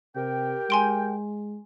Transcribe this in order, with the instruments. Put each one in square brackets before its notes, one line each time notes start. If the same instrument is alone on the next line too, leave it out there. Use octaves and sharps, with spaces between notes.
[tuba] C3 [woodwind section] G4 A#4 G5
[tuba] G#3 [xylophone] G#5 C6 D7